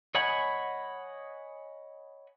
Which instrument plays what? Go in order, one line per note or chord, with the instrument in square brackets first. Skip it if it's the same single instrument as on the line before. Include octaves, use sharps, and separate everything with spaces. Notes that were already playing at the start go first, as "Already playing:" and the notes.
[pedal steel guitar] C#5 D#5 F#5 G#5 B5